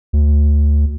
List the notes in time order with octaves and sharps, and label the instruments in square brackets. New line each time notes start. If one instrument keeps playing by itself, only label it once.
[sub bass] D2